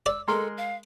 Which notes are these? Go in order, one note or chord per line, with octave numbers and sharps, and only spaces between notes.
D5 E6
G#3 A4 A#4 C6
F5